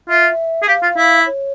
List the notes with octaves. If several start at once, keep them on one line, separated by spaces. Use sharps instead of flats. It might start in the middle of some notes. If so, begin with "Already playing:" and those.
F4 E5
G#4
G4 F5
F4
E4
C#5